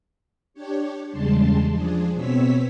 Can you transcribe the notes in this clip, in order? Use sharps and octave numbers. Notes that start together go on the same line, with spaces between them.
D4 G4 C#5
E2 C#3 G3 G#3 A5 C6
F3 D4 G#4
B2 B3 C4 C#5 E6 B6